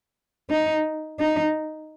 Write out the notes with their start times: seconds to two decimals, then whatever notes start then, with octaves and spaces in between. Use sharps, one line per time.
0.50 D#4
1.19 D#4